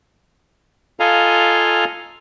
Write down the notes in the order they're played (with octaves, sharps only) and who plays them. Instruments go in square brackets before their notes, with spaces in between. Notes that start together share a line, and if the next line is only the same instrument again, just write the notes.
[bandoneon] F4 A4 D#5 F5 G#5 A#5